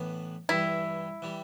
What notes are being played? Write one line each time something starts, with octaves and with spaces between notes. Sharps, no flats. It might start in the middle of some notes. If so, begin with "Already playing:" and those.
Already playing: A2 E3 B3 D4
G2 E3 G3 E4
E3 G3